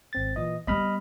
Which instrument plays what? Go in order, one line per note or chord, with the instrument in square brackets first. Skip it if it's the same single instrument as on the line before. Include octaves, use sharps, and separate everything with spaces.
[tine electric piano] G#1 C4 A6
A#2 E3 D#5
[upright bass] G3 B3 [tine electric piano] D#5 B5 F6